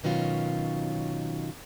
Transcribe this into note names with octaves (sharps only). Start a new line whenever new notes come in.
B2 D#3 F#3 C#4 F4